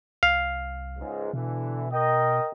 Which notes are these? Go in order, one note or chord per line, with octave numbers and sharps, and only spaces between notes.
C2 F5
C#2 G#2
B2 D3 E3
A#4 D#5 G5